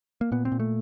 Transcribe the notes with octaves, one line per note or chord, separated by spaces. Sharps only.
A#3
A#2 B3
C4
A#2
A3